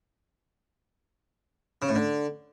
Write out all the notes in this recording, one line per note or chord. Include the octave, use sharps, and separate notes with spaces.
C#3
A2
D3